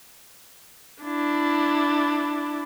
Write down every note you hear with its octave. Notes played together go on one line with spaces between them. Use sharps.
D4 E4